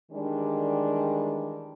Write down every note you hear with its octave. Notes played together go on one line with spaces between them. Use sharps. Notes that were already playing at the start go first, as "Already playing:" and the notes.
D#3 E3 G3 G#3 D4